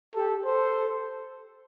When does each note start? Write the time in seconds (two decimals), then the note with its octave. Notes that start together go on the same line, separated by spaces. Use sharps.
0.15 G4 A4
0.45 A4 C5